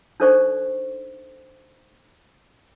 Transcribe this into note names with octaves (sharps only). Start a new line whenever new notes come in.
D4 D#4 A4 C5 D5 C#6